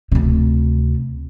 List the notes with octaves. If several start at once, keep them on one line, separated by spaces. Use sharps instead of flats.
D2 C3